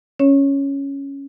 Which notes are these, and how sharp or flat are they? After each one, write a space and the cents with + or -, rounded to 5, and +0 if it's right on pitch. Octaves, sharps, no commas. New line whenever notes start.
C#4 +0 C#5 +0